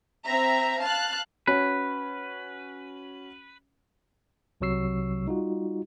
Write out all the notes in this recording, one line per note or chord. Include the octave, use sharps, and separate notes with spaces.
C4 E5 A#5
F5 A5 F#6
C#4 F#4 B4 C#5
C2 C3 F#3 C#6 E6 C7
G3 D#4 F4 F#4